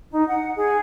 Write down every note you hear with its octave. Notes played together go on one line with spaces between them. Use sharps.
D#4
F#5
G#4